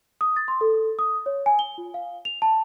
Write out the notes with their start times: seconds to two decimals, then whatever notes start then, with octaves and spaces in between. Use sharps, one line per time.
0.21 D#6
0.36 A6
0.48 C6
0.61 A4
0.99 D#6
1.26 C#5
1.46 G#5
1.59 G7
1.78 F4
1.94 F5
2.25 F7
2.42 A5